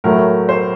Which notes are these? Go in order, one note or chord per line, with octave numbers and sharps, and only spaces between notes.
A2 F#3 A3 A#4
C5